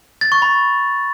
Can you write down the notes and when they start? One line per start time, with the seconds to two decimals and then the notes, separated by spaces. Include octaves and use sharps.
0.21 A6
0.32 C#6
0.42 B5